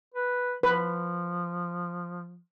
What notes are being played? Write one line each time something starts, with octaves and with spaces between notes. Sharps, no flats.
B4
F3 B4